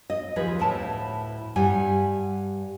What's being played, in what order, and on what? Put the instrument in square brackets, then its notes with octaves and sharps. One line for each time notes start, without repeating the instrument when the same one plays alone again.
[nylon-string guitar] D#5
D#2 F3 G#4 B4
D2 A2 E4 A5
G2 G3 F#5 G#5